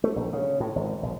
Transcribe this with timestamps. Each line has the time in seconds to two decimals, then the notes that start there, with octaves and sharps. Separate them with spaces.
0.04 A3
0.16 A#1
0.33 C#3
0.60 A2
0.76 G#1
1.03 A#1